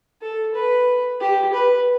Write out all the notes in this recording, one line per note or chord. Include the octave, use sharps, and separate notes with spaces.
A4
B4
G4
B4